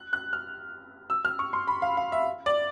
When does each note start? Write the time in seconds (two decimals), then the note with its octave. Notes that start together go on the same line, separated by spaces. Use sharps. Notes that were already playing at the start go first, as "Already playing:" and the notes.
Already playing: F#6
0.13 F#6
0.33 F6
1.10 E6
1.25 F6
1.39 C#6
1.53 C6
1.67 B5
1.82 F5
1.97 F5
2.12 E5
2.46 D5